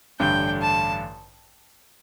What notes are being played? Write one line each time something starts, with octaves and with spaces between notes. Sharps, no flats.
A1 G2 D3 G5
A5